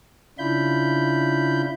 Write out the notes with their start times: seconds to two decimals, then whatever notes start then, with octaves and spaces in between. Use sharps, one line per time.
0.38 C#3 D4 E4 F4 B5 G6